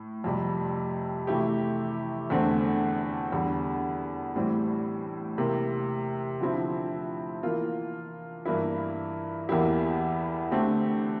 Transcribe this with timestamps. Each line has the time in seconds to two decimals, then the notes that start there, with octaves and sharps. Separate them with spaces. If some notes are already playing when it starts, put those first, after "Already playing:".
Already playing: A2
0.24 F2 C3 G3
1.27 C3 E3 A3 E4 G4
2.30 E2 D3 A3 C4
3.32 E2 D3 G3
4.36 A2 E3 G3 C4
5.38 C3 E3 A#3
6.40 D3 F3 C4 E4
7.43 E3 A#3 F4
8.45 G2 E3 A#3 E4
9.49 E2 E3 A#3 E4 G4
10.51 D3 A3 C4 G4